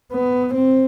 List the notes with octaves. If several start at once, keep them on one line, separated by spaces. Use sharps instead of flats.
B3
C4